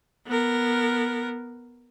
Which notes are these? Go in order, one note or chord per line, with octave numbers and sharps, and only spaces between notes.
B3 A#4